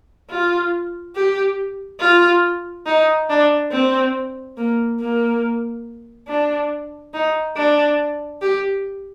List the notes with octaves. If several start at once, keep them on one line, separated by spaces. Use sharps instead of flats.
F4
G4
F4
D#4
D4
C4
A#3
A#3
D4
D#4
D4
G4